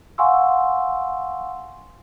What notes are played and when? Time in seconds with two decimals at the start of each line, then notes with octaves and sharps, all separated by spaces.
0.18 F5 F#5 G#5 C6 C#6 E6